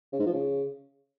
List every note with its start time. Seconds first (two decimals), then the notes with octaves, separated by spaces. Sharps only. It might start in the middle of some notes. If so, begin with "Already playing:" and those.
0.12 C#3
0.19 G#2
0.26 F3
0.33 C#3